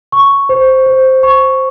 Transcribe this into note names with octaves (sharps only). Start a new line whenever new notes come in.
C#6
C5
C5
C#6